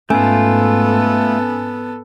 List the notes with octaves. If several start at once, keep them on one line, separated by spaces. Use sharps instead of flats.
G#2 A3 B3 C#4 F4 A4 G#5 E6